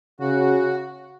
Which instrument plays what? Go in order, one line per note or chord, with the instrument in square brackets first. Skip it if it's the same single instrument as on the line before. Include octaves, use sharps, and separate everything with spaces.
[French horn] C#3 [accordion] F#4